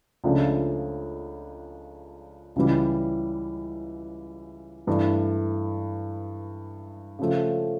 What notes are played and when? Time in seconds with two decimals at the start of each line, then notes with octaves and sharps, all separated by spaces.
0.24 C#2 C#3 F3 A3 D4
2.56 C#2 C#3 E3 G3
4.87 G2 E3 A3
7.19 C#3 F3 A3